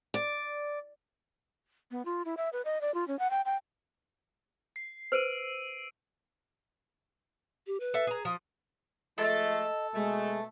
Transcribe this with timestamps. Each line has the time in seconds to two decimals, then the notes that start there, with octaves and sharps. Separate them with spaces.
0.14 D5
1.91 B3
2.05 F4
2.25 E4
2.37 E5
2.53 B4
2.65 D#5
2.81 D5
2.94 F4
3.08 C#4
3.19 F#5
3.31 G5
3.45 G5
4.76 C7
5.12 B4 C5 E6 D7 D#7
7.67 G4
7.80 B4
7.94 A4 E5
8.07 G#4 A#5
8.25 F3 D#6
9.18 F3 G#3 A3 A4 D#5
9.94 B2 G#3 A3